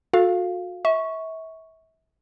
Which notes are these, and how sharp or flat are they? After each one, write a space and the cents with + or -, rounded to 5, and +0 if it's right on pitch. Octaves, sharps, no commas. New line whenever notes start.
F#4 -35 A4 +0 F5 +0
E5 -35 C#6 +0